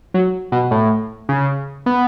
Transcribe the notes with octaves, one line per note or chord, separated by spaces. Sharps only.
F#3
B2
A2
C#3
B3